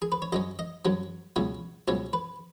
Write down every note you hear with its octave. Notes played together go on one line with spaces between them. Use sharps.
G#4
B4
C#5
F#2 F#3 C#4 D#5
D#5
F#2 F#3 C#4
C#2 B2 F#3 C#4
C#2 B2 F#3 C#4 C#5
B4